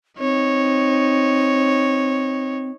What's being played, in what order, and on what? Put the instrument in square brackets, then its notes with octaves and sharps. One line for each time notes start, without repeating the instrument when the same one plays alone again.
[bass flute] C4 [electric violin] D#4 C#5